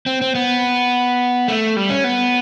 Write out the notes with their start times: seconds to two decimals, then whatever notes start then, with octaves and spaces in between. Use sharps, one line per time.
0.06 C4
0.21 C4
0.35 B3
1.48 A3
1.76 G3
1.90 C#4
2.04 B3